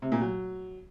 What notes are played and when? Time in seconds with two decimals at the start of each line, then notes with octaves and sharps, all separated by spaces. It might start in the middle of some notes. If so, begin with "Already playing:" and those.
0.02 C3
0.12 A#2
0.21 F#3